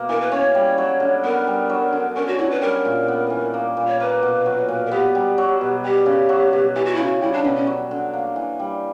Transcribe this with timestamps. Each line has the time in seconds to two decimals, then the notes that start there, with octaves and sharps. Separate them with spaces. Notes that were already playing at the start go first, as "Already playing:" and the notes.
Already playing: B2 A#3
0.09 E3 A#4
0.21 B4
0.31 C#4 C#5
0.55 G3
0.78 F#3
1.00 D3
1.24 B3 A#4
1.47 G3
1.69 F#3
1.93 D3
2.15 C#4 A#4
2.27 F#4
2.39 F#3 E4
2.50 B4
2.61 G3 A#4
2.85 A#2
3.08 B3
3.30 E3
3.54 A#3
3.77 A#2
3.87 C#5
4.00 A#3 B4
4.23 B2
4.46 F#3
4.69 A#2
4.86 A#4
4.91 B3 G4
5.15 G3
5.38 F#3
5.61 B2
5.84 G3 G4
6.06 C#3
6.29 F#3
6.53 B2
6.75 E3 G4
6.85 F#4
6.95 C#3 E4
7.05 F#4
7.21 G3 E4
7.33 D4
7.44 B2 C#4
7.56 C#4
7.67 F#3
7.91 D3
8.13 A#3
8.36 E3
8.60 G3